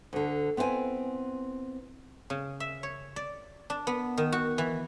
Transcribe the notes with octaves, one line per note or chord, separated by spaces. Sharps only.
D2 D3
B3 C4 E4 E5 G#5
C#3
E5
C#5
D5
D4
B3
D#3
F#4
E3